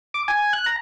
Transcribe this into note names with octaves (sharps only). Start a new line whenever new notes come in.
D6
G#5
F#6
A#5